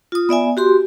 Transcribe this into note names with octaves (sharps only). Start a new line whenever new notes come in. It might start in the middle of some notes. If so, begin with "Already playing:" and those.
F4 D#6
B3 D5 E5 G#5
F#4 G4 C6